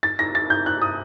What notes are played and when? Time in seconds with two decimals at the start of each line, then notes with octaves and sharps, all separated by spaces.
0.03 A6
0.19 A#6
0.35 A6
0.50 G6
0.66 F#6
0.82 D#6